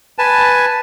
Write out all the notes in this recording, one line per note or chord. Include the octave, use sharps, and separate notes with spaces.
B4 G#5 A5